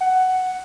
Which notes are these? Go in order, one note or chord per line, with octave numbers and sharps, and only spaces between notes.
F#5